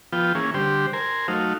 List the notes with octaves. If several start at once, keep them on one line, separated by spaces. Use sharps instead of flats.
F3 B3 F4 G5
E3 A#3 C#4 G#4
D3 G3 G4 C5
A#4 C5 G#5
F#3 A3 D#4 F5